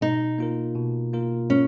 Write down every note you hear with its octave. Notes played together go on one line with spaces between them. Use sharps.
B2 D#4
A#3 F4 A#4
B2
A#3 F4 A#4
C#4